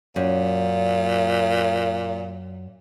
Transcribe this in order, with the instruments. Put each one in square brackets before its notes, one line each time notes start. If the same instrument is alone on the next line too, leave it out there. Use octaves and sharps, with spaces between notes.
[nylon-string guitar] F#2 [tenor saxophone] A#2